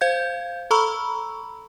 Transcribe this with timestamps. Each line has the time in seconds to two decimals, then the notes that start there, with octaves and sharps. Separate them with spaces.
0.01 C5 F5 G6 G#6
0.71 A4 A#5 B5 C#6 E6